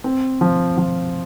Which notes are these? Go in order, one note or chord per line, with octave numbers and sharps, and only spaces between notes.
C4
F3
F3